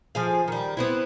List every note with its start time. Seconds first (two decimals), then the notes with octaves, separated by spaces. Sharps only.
0.15 F3 G#4 F5
0.48 D#3 G3
0.77 B3 C4 E4